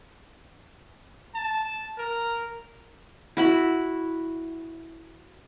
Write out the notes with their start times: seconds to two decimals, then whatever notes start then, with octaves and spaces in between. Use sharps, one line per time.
1.35 A5
1.98 A#4
3.37 E4 F#4 B5